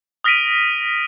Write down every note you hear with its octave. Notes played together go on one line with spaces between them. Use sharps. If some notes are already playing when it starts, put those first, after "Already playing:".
D#6 F6 A#6 B6 D7 D#7